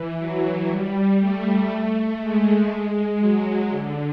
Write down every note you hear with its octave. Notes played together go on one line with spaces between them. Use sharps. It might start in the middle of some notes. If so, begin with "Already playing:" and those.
Already playing: E3
F#3
G3
A3
G#3
F#3
D3